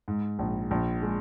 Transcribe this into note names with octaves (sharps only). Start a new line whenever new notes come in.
G#2
A#1
A#1
G#3